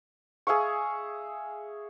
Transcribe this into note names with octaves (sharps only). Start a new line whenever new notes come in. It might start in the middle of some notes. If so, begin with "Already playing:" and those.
G#4 E5 F5 C#6